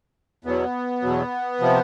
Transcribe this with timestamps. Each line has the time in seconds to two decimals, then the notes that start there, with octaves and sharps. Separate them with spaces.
0.44 E2 B2 F#3 B3
1.02 E2 B2 F#3
1.60 C3 F3